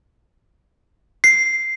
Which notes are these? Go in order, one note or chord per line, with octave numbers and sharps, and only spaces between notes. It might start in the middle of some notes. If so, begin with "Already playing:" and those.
C7